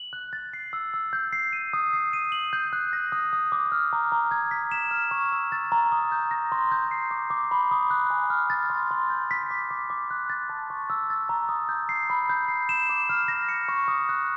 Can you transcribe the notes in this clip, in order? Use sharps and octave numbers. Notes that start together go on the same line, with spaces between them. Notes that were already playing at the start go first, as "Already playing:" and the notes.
Already playing: F#7
F#6
A6
C7
E6
E6
G6
C7
D#7
D#6
C7
D#7
F#7
G6
F#6
A#6
D#6
D#6
D6
F6
A#5
A#5
G#6
B6
E7
F6
C#6
E6
A6
A#5
D#6
G6
A#6
C6
G6
C7
D6
D6
B5
D#6
F#6
G#5
F6
A6
C6
C6
G6
B6
D6
D6
D6
F#6
A6
A5
C#6
E6
A6
A#5
D#6
G6
C7
B5
G6
C7
E7
D6
F6
A#6
C#7
C#6
D#6
F#6